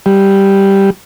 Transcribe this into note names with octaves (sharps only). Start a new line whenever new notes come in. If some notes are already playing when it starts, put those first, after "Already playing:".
G3